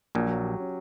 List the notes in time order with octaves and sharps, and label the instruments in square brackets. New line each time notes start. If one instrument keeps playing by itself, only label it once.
[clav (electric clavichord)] A#1 A#2 [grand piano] F#3
[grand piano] F#3
G4
C#4